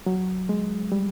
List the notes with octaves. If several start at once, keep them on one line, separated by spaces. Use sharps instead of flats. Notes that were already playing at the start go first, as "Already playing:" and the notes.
F#3
G#3
G3